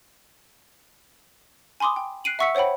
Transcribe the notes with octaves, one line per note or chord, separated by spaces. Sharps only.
G#5 B5 C6 D6 D#6
G5
F#6 C7 D7 D#7 F#7
E5 F#5 C#6 E6 B6 C#7
C5 C#5 F#5 G5 B5